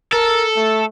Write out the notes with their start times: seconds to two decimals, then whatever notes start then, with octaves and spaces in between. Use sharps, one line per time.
0.12 A4 A#4
0.56 A3